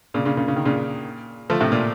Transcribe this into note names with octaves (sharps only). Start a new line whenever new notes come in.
A#2 C#3
A#2 C#3
A#2 C#3
C#3
D#3
A#2 C#3
F3 A3
A2 C3
A#2